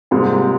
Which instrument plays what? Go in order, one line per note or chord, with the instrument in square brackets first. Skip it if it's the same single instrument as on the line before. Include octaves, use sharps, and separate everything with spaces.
[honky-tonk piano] G#2 C3 [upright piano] G3 A#3 F4 G#4